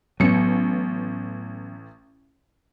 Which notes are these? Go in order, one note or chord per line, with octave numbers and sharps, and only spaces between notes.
A1 F#3 B3 C#7